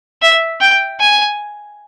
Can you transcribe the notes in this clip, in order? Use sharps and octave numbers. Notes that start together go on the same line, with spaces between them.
E5
G5
G#5